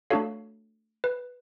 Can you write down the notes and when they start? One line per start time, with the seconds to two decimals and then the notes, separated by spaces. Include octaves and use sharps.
0.10 A3 D4 F#4 A4 C#5 F5
1.04 B4